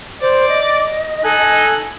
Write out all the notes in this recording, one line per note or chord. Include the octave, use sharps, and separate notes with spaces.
C5 D5
D#5
D#4 A4 G#5 F#6